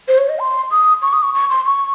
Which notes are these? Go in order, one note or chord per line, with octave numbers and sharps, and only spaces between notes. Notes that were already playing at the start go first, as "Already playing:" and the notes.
C5
C#5
D#5
C6
D#6
C#6
D#6
C#6
C#6
C6
C#6